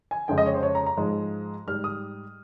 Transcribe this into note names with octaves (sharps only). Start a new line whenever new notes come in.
G#5
F2 C#3 G#3 G5
D#5
C#5
C5
C#5
A#5
A#5
G#2 F3 G#3
G#2 G3 F6
D#6